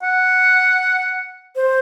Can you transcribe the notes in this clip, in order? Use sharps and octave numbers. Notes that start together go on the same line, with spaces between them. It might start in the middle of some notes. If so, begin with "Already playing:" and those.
F#5
C5